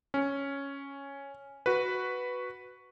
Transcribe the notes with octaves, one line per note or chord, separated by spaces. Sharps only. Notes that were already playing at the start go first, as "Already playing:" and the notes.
C#4
F#4 B4